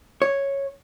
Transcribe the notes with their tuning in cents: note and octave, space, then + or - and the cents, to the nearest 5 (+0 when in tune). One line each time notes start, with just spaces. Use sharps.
C#5 -5